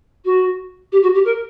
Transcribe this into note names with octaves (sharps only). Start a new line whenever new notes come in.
F#4
G4
F#4
G4
A#4